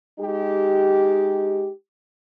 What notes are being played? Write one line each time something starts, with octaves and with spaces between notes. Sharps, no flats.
G#3 D#4 G4